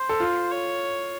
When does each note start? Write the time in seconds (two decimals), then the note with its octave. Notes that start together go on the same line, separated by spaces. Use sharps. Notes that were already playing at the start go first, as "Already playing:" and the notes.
Already playing: C5
0.09 A4
0.20 F4
0.51 C#5